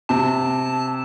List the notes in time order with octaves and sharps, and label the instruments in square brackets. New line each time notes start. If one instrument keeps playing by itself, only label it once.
[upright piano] C3 [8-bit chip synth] A5